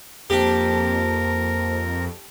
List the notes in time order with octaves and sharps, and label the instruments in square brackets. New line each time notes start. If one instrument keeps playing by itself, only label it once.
[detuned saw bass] F2 [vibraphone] A#3 C5 A5 [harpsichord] D4 G4 [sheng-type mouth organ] A#4